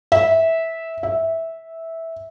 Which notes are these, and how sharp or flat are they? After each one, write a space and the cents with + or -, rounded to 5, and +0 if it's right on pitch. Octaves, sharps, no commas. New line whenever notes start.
E5 -15
E5 -10